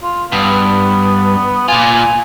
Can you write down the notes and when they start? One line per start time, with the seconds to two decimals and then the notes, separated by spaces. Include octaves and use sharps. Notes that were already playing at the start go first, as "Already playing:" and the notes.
0.03 F4
0.32 G2 B3
1.68 A#2 F4 G#5